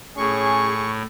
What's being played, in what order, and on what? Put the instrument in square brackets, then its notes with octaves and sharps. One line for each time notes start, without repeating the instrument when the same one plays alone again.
[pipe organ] A2 [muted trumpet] C#4 [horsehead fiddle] G#4 [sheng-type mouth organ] C#6